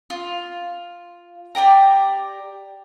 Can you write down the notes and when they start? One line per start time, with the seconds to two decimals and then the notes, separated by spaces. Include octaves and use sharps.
0.10 F4
1.55 G4 D5 G5 A#5